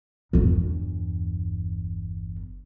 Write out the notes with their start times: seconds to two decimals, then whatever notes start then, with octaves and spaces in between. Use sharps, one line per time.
0.33 G1 E2